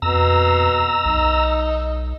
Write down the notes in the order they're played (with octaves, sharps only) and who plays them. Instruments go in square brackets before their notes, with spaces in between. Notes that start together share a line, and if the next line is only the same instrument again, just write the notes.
[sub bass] F2 [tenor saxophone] B2 [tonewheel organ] A#5 E6
[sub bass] B1 [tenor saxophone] D#4